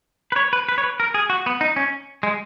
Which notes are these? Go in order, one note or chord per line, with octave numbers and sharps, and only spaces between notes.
B4
C#5
B4
B4
C#5
B4
A#4
G#4
F#4
B3
D#4
C#4
G#3